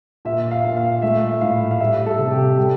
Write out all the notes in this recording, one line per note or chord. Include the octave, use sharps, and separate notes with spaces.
A#2 E5
F5
A#2
F5
A3 E5
A2 F5
F5
G3 E5
A4
C3
G4
G3 G4